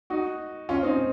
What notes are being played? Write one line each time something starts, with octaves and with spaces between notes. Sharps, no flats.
D#4 F#4
C#4 F4
C4 D#4